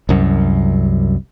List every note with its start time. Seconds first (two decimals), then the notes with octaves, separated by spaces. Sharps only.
0.09 C2 F#2